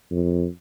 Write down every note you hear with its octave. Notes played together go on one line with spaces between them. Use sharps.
F2